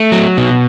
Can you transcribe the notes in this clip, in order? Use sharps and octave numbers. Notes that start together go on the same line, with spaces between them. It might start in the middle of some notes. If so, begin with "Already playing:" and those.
Already playing: A3
F#3
B2